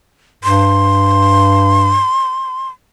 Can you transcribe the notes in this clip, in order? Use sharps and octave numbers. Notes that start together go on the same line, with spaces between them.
G2 C6